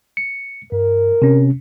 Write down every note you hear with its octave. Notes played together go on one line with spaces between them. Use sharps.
C#7
G2 A#4
C3 C#4